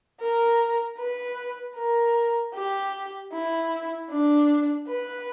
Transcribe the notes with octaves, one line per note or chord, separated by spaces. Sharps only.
A#4
B4
A#4
G4
E4
D4
B4